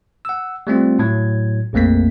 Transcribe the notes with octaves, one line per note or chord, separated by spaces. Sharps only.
F#5 E6
G3 A3 C4 F4
A2 F#3 G#6
A#1 F2 A3 A#3 B6